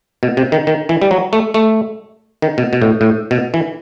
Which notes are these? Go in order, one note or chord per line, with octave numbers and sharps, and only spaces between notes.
B2
C3
D#3
D#3
E3
G3
F#3
A3
A3
D#3
B2
B2
A2
A2
B2
E3